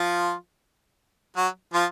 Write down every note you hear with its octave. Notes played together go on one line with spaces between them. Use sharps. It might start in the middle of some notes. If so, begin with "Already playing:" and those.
Already playing: F3 F4
F#3 F#4
F3 F4